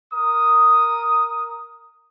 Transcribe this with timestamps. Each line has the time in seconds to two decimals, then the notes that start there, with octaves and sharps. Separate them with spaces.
0.12 A#4 D#6